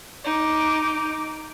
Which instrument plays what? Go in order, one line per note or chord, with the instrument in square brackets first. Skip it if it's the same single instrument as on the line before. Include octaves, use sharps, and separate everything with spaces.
[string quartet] D#4 D6